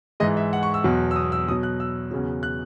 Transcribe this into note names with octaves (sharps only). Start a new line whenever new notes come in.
G#2 E3 G#3 D#5
E5
F#5
C#6
E6
E2 B2 F#3
E6
D#6
E6
B2 F#3 D#6
F#6
E6
E2 C#3 F#3
F#6